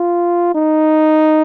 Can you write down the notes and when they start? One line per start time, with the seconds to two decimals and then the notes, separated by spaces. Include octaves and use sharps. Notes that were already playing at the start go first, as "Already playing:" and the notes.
Already playing: F4
0.55 D#4